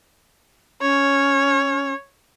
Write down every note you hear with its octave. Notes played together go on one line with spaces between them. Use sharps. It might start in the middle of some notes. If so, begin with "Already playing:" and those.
C#4 C#5